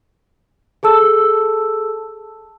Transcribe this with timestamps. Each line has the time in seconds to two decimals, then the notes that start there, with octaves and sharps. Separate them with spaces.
0.83 G#4 A4 A5 E6